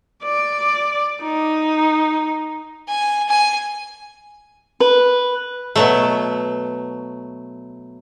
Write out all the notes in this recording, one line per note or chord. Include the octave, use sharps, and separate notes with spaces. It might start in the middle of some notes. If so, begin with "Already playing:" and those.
D5
D#4
G#5
G#5
B4
B2 F#3 A3